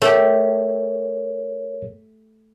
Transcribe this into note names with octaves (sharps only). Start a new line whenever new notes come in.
A3 G4 G#4 A#4 C#5